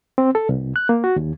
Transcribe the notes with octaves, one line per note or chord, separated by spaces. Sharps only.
C4
A4
C2
F#6
A#3
F#4
D#2